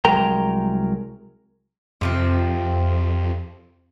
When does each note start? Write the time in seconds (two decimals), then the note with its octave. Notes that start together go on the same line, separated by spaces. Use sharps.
0.05 C2 F#3 G#3 A#4 G5 A#5
2.01 F2 C3 F3 C4